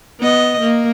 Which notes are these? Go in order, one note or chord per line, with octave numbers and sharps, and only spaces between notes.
B3 D#5
A#3